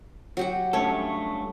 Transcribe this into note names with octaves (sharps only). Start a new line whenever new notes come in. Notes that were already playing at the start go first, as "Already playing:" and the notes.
F#3 G4 F#5
G2 A3 C#4 A4 C#5